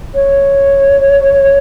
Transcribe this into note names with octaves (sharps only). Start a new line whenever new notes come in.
C#5